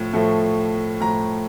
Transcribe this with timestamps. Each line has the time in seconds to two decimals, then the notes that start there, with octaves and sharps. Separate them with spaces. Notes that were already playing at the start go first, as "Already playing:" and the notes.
Already playing: A2 F3 A3
0.13 A2 F3 A3
1.00 A2 F3 A3 A#5